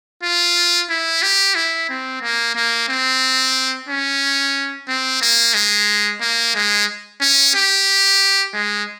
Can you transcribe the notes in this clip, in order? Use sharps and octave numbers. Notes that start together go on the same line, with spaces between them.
F4
E4
G4
E4
C4
A#3
A#3
C4
C#4
C4
A#3
G#3
A#3
G#3
C#4
G4
G#3